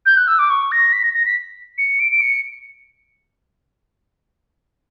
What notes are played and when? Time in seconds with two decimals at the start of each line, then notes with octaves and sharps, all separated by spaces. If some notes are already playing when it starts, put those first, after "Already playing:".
0.06 G6
0.17 F#6
0.28 E6
0.39 D6
0.50 C#6
0.72 A#6
0.93 B6
1.03 A#6
1.14 A#6
1.25 B6
1.78 C#7
2.00 D7
2.12 D7
2.21 C#7